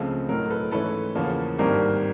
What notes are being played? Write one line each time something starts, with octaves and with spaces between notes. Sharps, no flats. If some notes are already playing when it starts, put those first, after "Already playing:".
Already playing: C#2 C#3 F3 A3 C4
B1 A2 F#3 A#4
A4 B4
G#2 E3 A3 C#4 A4 B4
E2 C#3 F3 A#3 C#4
G#1 G2 D#3 G3 A#3 A#4